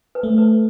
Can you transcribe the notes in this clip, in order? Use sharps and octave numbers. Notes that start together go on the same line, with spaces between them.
B4
A3
B4